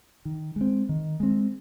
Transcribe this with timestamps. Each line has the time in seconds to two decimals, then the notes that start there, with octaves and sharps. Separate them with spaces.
0.25 D#3
0.56 G#3 C4
0.89 D#3
1.20 G#3 C4